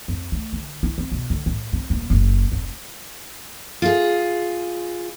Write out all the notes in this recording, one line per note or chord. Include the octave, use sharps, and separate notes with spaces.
F2
A3
D3
E4
C4
B2
D3
A2
C4
D#1
F#1
F1
F4 G#4